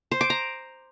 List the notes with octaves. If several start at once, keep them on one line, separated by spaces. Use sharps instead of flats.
C5
D6
A#5